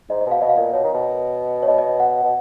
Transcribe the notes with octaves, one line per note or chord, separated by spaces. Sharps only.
G#2 D#5
D#5
B2
F5
B2 D#5
F5
A#2 D#5
B2 C#5
D#3
B2
C#5
B2 D#5
D#5
D#5
F#5
B2